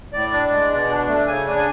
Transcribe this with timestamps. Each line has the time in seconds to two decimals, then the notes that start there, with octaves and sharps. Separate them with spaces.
0.13 A2 D5
0.32 D4
0.51 G#3
0.70 B2
0.89 D4
1.08 A3
1.27 C#3 G#5
1.47 D4
1.56 G#5